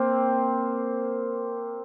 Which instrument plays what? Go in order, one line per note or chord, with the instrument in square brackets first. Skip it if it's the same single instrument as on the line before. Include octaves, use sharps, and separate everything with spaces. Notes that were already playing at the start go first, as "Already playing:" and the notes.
Already playing: [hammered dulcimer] A#3 C4